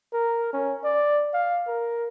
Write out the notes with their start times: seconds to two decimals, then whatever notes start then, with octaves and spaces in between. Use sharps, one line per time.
0.13 A#4
0.53 C#4
0.84 D5
1.33 F5
1.67 A#4